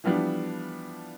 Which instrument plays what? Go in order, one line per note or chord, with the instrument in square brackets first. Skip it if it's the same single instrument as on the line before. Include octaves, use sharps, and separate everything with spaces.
[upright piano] E3 F3 G3 B3 D4